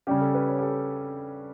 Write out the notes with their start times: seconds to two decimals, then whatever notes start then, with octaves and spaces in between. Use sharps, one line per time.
0.07 C#3 G3 C#4 G4
0.21 A4
0.35 B4
0.49 C#5
0.58 G4
0.62 A4